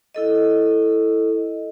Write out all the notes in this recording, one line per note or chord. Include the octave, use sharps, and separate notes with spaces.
E4 A4 D#5